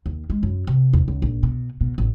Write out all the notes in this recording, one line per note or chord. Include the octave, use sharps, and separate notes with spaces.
D#2
G#3
F#2
C3
E2
C#2
A#1
B2
B2
A1